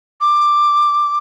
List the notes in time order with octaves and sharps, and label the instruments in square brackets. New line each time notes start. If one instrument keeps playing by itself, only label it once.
[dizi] D6